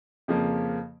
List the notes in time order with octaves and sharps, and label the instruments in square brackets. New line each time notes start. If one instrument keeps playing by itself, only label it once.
[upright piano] F2 C#3 F3 A#3